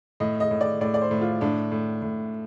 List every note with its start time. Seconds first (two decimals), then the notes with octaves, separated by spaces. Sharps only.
0.20 A2 D#5
0.40 D#5
0.51 A2
0.61 D5
0.81 A2 D5
0.94 D5
1.01 C5
1.11 A2
1.21 F4
1.41 A2 D4
1.72 A2
2.02 A2